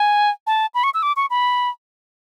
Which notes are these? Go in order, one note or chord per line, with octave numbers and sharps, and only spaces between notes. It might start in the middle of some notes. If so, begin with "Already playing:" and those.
Already playing: G#5
A5
B5
C#6
E6
D6
C#6
B5